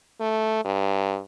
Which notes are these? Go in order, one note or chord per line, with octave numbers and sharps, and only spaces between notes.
A3
G2